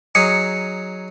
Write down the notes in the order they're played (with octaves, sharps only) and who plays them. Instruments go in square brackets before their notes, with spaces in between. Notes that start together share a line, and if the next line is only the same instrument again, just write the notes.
[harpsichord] F#3 D#4 G#4 [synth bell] C#7